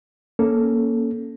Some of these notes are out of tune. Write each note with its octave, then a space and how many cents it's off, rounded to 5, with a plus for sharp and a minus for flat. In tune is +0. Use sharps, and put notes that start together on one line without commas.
A#3 +0 C#4 +0 A4 +0